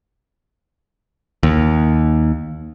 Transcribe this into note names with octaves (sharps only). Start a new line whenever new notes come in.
D#2